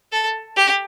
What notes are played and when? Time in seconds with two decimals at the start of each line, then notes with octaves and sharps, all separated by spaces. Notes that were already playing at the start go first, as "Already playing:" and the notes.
0.12 A4
0.57 G4